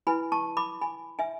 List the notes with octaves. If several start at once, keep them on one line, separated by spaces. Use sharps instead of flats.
E4 B4 G#5 B5
A5 C#6
B5 D6
G#5 B5
E5 G#5